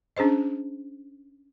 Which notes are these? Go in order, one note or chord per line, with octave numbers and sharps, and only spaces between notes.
C#4 D4 G#4 C5 D#5